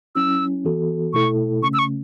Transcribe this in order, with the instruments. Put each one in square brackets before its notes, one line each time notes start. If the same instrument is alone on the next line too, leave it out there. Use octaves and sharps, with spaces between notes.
[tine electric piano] F#3 C#4 E4 [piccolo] E6
[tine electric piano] E3 B3 F#4 A4
[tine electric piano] B2 A3 E4 A4 [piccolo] C#6
[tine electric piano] C#3 A3 C#4 [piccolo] C#6
[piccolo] E6
C#6